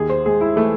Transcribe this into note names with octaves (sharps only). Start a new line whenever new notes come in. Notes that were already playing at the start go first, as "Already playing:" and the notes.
Already playing: D#2 G#4
C5
G#3 G#4
E4
E3 A3